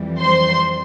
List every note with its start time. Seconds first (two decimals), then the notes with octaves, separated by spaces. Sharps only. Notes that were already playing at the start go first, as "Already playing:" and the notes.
Already playing: F2 E3 G3
0.19 C5 C6